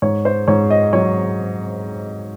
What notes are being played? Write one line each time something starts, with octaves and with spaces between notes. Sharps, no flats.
G#2 C#5
C5
G#2 C#5
D#5
F#3 C#5